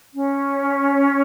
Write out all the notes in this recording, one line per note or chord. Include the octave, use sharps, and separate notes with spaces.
C#4